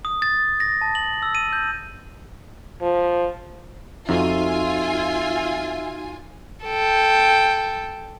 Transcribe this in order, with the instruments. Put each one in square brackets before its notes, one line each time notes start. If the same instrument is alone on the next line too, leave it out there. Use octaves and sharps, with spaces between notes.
[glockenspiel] D#6
A6
A#6
A5
F#7
E6
D#7
G6
[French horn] F3
[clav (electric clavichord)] F2 [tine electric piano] D#4 F#4 [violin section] F4 G#5 [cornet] E5
[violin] A4 G5